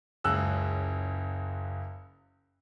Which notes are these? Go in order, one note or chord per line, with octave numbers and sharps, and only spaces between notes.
F#1 C#2 E6 F#6